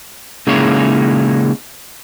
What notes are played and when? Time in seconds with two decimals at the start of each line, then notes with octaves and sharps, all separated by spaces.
0.47 C#3 G#3 A#3 D#4 E4 C#5